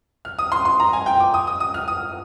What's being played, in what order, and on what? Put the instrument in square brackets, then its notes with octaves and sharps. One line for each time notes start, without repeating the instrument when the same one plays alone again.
[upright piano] F6
D#6
C6
C6
A#5
G#5
G5
D6
D#6
D#6
D#6
F6
D#6